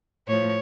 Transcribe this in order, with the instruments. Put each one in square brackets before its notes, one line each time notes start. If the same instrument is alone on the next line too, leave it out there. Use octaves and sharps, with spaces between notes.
[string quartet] A2 F3 C#5